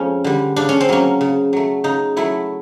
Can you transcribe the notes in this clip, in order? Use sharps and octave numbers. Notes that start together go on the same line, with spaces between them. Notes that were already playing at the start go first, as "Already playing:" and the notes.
Already playing: F2 F3 G#3 C#4
D3 G3
C#3 D4
C#4
C4
F#3 A#3 C#4
C#3
F#3 A3
C#3 D#4
F#3 A3 E4